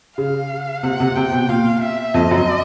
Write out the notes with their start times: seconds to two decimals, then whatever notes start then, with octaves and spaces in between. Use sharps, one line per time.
0.18 C#3 F5
0.83 C3 F#5
1.00 C3
1.16 C3 G5
1.32 B2
1.49 A#2 F5
1.82 E5
2.14 F2 D#5
2.31 F#2